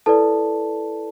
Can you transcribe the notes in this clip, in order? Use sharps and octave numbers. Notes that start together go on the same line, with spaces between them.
E4 A4 B4 D5 A5